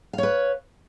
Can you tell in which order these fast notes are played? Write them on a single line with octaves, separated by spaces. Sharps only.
F5 C#5 B4